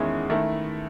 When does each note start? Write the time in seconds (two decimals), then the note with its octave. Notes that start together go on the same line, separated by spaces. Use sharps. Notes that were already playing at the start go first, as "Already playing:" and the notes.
Already playing: E2 D#3 G#3 C#4 E4
0.30 D#3 A3 E4